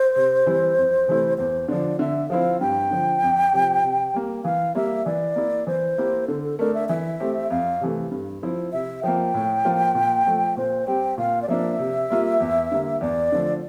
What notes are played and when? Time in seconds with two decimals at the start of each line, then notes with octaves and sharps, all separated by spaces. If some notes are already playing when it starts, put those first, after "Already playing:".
Already playing: C5
0.16 C3
0.46 E3 G3 C4 E4
0.77 F2
1.08 C3 E3 A3 E4
1.38 E2 C5
1.68 D3 F3 D5
1.99 D3 E5
2.30 F3 C4 E4 F5
2.60 G2 G5
2.91 D3 F3
3.22 F2
3.53 C3 F3
3.83 C3
4.14 G3 A#3
4.44 E3 F5
4.75 G3 A#3 E5
5.06 E3 D5
5.36 A#3 E4
5.67 E3 C5
5.98 A#3 E4 G4
6.28 D3 A4
6.43 A4
6.58 A3 D4 A#4
6.75 E5
6.89 E3 E5
7.20 A3 C4 G4
7.50 F2 F5
7.81 C3 E3 A3
8.11 G2
8.42 F3 C4 E4
8.72 C3 E5
9.03 F3 A#3 G5
9.34 A2
9.65 F3 A#3 F4
9.95 A#2
10.26 F3 A3
10.57 A#2 C5
10.87 G3 C4 G4 G5
11.18 A#2 F5
11.42 D5
11.48 F3 A#3 D4 E5
11.79 C3
12.10 G3 A#3 F4
12.40 E2
12.72 D3 G3 A#3
13.01 E2 D5
13.32 D3 F3 A3